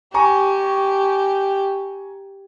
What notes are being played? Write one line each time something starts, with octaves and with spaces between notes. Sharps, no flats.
G4 G#5 A#5 C#6